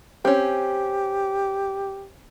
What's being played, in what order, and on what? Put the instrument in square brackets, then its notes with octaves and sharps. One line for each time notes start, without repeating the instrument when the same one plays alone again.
[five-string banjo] C4 C#4 [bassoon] G4